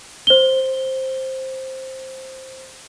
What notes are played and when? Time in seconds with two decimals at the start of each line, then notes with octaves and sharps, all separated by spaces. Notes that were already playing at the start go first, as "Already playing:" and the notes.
0.27 C5 G7